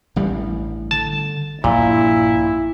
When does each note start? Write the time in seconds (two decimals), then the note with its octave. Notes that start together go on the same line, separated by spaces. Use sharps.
0.16 A1 G2 G3
0.91 D3 A5
1.64 A#1 G2 A#2 E4